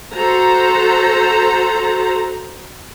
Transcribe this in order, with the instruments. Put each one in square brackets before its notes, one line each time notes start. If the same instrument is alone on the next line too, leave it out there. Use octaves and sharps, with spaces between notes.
[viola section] F#4 A4 C5 A#5